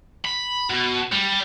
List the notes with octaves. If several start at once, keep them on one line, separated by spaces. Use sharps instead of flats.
B5
B2
G3